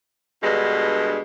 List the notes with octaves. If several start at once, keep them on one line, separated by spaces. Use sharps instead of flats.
G2 B2 D3 G#3